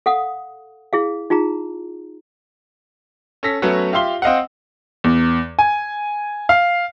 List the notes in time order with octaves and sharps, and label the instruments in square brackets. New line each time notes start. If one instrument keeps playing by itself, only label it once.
[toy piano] A4 F5 F#5 D#6
E4 G#4 F5
D#4 F4 G#4 A#5
[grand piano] C#4 A4 A#6 B6
F#3 A3 B3 C#4 F#4
F4 G4 E5 F5 C6 G7
C4 D#5 F5 F#5
[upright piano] E2
G#5
F5